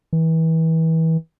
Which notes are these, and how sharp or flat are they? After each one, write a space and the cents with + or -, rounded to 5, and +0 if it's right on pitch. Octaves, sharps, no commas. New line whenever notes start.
E3 -30